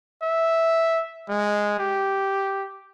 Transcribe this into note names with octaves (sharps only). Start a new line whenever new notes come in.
E5
G#3
G4